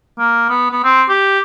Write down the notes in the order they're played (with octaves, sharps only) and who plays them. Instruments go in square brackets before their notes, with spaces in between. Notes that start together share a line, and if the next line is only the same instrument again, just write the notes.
[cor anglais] A#3
B3
B3
C4
G4